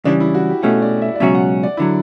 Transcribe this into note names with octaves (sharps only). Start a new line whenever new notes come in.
C#3 E3 G3 D4
E4
F#4
G4
B2 A3 C#4 F#5
D5
E5
D5
C#2 B2 F#3 C#4 F#4 E5
F#5
D5
D3 F#3 E4